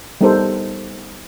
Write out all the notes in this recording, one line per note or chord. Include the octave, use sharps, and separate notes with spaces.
G3 B3 D#4 A4 A#4 C5